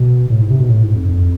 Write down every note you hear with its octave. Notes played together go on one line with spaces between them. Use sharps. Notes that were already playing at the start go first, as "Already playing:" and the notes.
Already playing: B2
A2
G#2
C3
B2
A2
G#2
F2
F2